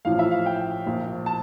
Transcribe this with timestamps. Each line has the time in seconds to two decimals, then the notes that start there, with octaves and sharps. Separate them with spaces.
0.05 A1 A2 F3 F5
0.19 E5
0.31 F5
0.46 G5
0.86 A#1 A#2 F3
1.26 A5